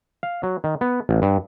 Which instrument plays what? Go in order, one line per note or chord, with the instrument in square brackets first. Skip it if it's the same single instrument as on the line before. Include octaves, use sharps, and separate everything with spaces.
[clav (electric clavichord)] F5
F#3
D#3
B3
A1
G2